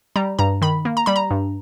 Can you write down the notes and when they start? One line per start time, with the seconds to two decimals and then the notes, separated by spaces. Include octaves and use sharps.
0.16 G3 A#5
0.39 G2 A#5
0.62 D#3 B5
0.85 A#3
0.97 A#5
1.06 G3 B5
1.16 A#5
1.31 G2